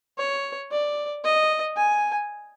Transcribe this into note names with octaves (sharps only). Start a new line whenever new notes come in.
C#5
D5
D#5
G#5